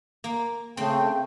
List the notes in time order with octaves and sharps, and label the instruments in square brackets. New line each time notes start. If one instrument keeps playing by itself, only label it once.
[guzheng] A#3
[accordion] C#3 [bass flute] A3 [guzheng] C4 [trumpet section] G5